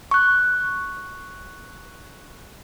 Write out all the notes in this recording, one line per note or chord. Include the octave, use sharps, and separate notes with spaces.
C#6 F#6